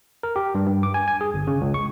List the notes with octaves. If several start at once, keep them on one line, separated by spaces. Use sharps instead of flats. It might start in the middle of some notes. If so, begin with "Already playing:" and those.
A#4
G4
G2
G2
D6
G#5
G#5
G#4
G1
C#3
C#2
C#6